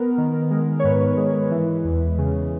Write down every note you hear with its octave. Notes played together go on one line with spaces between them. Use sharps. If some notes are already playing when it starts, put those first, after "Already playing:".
Already playing: B3 A#4
D#3
G#3
C#5
G#2 B4
G#3
E3
E2
C#3